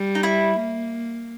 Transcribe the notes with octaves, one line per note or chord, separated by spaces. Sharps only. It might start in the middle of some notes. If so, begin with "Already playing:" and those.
Already playing: G3
D#4
E4
A#3